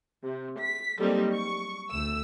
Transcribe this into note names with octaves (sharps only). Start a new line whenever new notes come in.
C3
B6
F#3 G3 A#3 C4 D#4 A4
C#6
D2 A3 E6